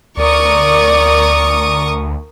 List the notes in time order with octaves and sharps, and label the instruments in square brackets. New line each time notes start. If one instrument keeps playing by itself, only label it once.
[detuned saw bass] D2 [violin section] A#4 C#6 D#6 [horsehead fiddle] D5